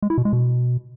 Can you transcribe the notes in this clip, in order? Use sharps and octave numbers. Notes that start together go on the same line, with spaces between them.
G#3
E4
B2
G#3
B2